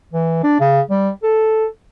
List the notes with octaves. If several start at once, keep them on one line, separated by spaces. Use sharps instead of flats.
E3
D4
C#3
G3
A4